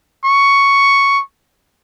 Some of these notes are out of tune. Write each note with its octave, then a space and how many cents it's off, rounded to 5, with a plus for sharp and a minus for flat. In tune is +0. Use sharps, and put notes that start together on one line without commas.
C#6 +5